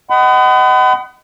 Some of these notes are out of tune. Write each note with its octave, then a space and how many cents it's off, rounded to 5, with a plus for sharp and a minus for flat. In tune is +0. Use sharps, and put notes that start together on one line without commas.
D#5 +0 F#5 +35 B5 +40